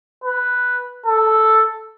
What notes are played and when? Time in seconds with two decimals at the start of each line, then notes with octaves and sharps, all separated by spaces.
0.24 B4
1.06 A4